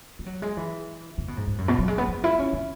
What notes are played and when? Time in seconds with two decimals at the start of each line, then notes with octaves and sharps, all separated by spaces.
0.19 G#3
0.26 F#3
0.42 G#3
0.57 E3
1.18 C#3
1.28 B2
1.37 G#2
1.47 G#2
1.58 F#2
1.68 B2
1.78 F#3
1.88 G#3
1.98 B3
2.08 B3
2.24 E4
2.39 C#4
2.53 C#4